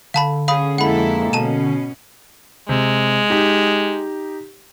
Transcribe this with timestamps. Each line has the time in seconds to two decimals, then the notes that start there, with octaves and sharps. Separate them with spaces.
0.14 D3 F5 A5 B5
0.48 C#4 G#4 F5 B5 D#6
0.78 F2 G#3 A#3 E4 A4 F#5 B5
1.33 B2 C#4 A5 D#7 E7
2.69 C3 G#3
3.30 D#4 G4